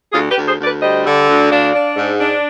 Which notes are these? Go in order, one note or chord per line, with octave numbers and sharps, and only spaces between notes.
D2 F4 G#4
G4 B4
D2
G#4 C5
D2
B4 D5
G3 C5 D#5
D3
D2
D4 D5 F5
D4
G#2
D4